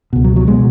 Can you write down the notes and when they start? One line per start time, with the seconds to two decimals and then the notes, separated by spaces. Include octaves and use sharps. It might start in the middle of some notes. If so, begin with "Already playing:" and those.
0.13 C#2 B2
0.24 F#3
0.36 F#3
0.48 B2 G#3